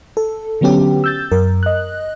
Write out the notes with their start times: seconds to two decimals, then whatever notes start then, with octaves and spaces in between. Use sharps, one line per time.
0.17 A4
0.61 D3 F#3 B3 C#4 G4
1.04 E6 G6 A6
1.32 F#2 A#4
1.63 D#5 F#6